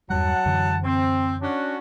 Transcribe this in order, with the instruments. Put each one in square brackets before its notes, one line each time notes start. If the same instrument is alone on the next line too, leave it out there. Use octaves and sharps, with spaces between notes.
[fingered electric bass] E2 G2 G3 [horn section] F#3 F#5 A5
[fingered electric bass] F#2 D3 E3
[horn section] C4
C#4 D4 F#4